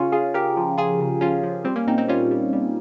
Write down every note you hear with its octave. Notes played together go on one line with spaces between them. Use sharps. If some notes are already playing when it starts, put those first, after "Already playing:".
Already playing: C#3 C#4 F4
C#3 F4 G#4
C#3 G4 A#4
F3
C#3 F4 G#4
C#3
F3 C#4 F4
F3
G3 C4
A#3 C#4
A#2 C4 D#4
C4 D#4
G3 C#4 F4
G3
G3